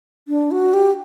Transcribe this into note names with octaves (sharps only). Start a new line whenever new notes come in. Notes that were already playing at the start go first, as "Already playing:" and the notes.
D4
F#4
G4